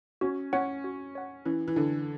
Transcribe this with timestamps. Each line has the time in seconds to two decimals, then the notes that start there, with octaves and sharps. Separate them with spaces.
0.21 C#4 F#4
0.53 C#4 C#5 F#5
0.84 F#4
1.15 C#5 F#5
1.45 E3 C#4
1.68 E3
1.76 D3 E4 A4